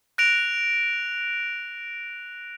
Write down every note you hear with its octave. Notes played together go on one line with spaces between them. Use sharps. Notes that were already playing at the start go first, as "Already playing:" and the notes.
F#6 A#6 D7 F7